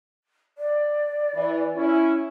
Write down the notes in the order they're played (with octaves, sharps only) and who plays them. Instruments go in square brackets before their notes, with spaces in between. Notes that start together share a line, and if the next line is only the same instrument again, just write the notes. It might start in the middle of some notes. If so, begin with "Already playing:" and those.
[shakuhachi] D5
[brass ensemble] E3
C#4 E4